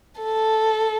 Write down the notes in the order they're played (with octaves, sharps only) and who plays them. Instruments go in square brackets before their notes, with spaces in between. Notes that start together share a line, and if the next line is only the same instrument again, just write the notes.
[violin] A4